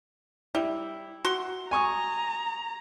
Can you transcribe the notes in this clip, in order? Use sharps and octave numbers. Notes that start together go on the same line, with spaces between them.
G3 E4
F#4 F#5 C6
G#5 A#5 C#6 D#6